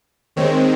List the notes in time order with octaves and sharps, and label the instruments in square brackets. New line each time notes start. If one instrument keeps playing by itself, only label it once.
[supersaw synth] D#2 D#3 G#3 C4 C#5